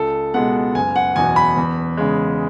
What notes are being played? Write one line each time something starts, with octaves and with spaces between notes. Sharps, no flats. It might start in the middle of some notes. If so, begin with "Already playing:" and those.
Already playing: C#2 A4
B2 G#3 B3 F#5
F#1 G#5
F#5
E2 B2 G#5
B5
E2
C#3 G#3